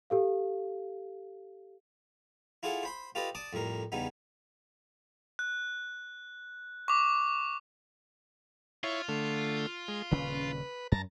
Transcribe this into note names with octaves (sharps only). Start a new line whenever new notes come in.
G4 A4 F5
E4 F4 G#4 A4 D5 F#5
C5 B5 C6
F4 G4 A4 B4 D5 D#5
D5 A5 D6 D#6
F2 A2 G3 A#4
E2 C#3 G3 B3 D#4
F#6
C#6 D6
E4 F4 C#5
D3 A3
G#3
D#1 C#3 C#4 B4
F#2 A5 A#5